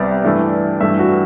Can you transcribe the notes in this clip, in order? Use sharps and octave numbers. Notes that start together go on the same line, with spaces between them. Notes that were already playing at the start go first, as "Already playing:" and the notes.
Already playing: C2 C3 G3 B3 D5
G2 E3 A3
G2 E3 A3 E5
F#4